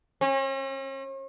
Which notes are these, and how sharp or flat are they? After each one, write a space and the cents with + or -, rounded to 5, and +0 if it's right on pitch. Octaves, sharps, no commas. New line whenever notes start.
C#4 -45